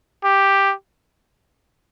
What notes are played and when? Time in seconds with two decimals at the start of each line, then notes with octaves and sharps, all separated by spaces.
0.24 G4